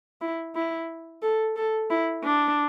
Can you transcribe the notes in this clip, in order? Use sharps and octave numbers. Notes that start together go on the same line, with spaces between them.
E4
E4
A4
A4
E4
D4